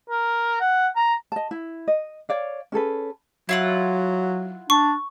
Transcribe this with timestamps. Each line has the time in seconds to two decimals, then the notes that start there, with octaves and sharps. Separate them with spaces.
0.10 A#4
0.61 F#5
0.96 A#5
1.32 D#5 A5
1.51 E4
1.88 D#5
2.29 C#5 D5 F5
2.72 C#4 G#4 A4 B4
3.49 F#3 E4 F4 F#5
4.70 D4 C#6